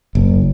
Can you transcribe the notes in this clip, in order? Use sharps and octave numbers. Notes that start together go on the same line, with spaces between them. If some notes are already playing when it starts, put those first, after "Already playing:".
F#1